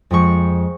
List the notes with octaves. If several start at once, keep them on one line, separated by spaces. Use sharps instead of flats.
F2 F3 G#3 C#6